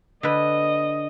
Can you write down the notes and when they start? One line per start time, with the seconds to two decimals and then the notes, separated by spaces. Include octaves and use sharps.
0.23 D3 B4 D#5